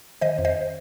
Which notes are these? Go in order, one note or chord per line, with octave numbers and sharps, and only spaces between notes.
D#3 C5 D#5
F2
C5 D#5